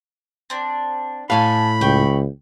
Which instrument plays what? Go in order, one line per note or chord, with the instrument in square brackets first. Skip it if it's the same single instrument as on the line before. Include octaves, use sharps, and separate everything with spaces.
[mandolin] C4 D4
[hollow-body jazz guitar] A2 F5 [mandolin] A4 G#5 [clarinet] B5
[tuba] C#2 [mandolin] G5 C#6